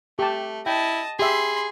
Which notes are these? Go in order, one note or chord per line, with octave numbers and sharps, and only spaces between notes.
A3 G4 A5
E4 D#5 G5 A5
G4 G#4 E5 B5 C6